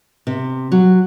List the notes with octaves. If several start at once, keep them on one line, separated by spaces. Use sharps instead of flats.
C3
F#3